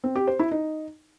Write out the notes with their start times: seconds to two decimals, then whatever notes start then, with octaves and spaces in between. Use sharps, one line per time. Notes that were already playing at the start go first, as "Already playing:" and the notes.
0.04 C4
0.16 G4
0.28 C5
0.39 E4
0.51 D#4